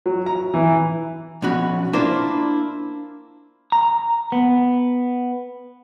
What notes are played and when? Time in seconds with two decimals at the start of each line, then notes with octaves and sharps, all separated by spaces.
0.06 F#3
0.26 A#5
0.54 E3
1.42 B1 F3 C#4 F#4 B5
1.93 A#3 D4 E4 F4 A#4 C5
3.72 A#5
4.32 B3